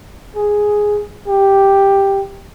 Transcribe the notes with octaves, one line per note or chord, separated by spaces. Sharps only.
G#4
G4